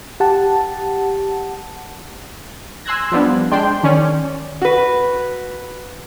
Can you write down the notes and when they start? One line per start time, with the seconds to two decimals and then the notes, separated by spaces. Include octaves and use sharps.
0.20 G4 F#5 A5
2.85 G#5 C6 E6 F#6 G#6 A#6
3.12 F3 G3 B3 D4
3.51 G#3 D4 G5 C6 G6
3.83 D#3 C#4 D5
4.62 F#4 B4